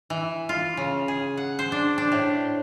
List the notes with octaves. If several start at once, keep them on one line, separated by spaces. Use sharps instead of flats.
E3
F4
C#3
G#4
F#5
C5
D4
D4
A2